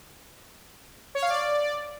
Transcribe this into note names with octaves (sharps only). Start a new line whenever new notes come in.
C#5
F5
D5